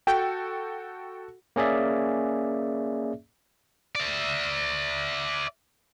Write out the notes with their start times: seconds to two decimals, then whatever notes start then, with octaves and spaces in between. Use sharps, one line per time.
0.07 F#4 A4 G5
1.56 A#3 C#4 G#4 D5 E5
3.95 D5 E5